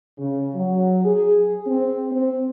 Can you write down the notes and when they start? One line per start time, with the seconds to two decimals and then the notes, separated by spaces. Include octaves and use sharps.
0.18 C#3
0.55 F#3
1.04 G#4
1.66 C4
2.11 C4